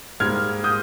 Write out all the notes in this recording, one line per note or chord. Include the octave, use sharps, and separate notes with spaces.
G#2 G3 A#3 F6 G#6
D#6 G6